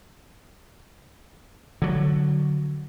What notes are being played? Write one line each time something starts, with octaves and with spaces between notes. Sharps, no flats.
D3 F#3